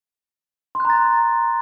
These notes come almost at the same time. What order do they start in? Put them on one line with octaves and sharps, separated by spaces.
C6 F#6 A#5 A6